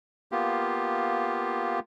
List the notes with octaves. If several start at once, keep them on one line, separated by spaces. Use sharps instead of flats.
A#3 B3 F4 G4